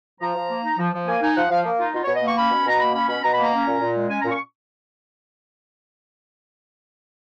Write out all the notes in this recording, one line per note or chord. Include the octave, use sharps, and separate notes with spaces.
F3 A#5
F3
A#3
D#4
F3
F3
A#3 G#5
D#4 G#5
F3 F#5
F3 F5
A#3
D#4 F4
B2 F4
C#5
B2
D#5
A#3 C#6
C#4 B5
B2
B2 A#5
A#3 B5
C#4 B5
B2 B5
B2 A#5
B5
A#3
A#5
C#4
A#2
A#2
G#3
C#4 G#5
A#5
A#2
C#6